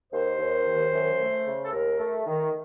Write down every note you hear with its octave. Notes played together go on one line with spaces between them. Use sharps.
D#2 C5
D#2
D#3
F#2
A3
C#3
A4
D#2 A#4
A3
D#3